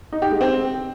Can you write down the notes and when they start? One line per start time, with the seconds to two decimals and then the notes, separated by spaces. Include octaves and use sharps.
0.12 D#4
0.22 G4
0.31 G#3
0.41 C4